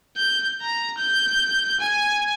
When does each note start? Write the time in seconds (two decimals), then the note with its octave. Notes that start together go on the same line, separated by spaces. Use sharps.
0.17 G6
0.61 A#5
0.98 G6
1.80 G#5